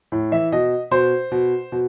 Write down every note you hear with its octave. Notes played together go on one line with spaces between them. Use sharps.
A2
E3 E5
B2 D#5
B2 C5
B2
B2